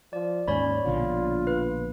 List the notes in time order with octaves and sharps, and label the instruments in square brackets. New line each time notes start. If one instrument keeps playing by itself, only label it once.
[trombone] F3 [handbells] D5
[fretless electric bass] D#2 G#2 [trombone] C#4 [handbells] C#5 D5 B5
[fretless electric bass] A#1 B2 D3 [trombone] F4
[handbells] B4